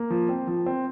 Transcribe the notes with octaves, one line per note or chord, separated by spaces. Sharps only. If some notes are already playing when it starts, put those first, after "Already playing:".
Already playing: A#3
F3
C4
F3
C4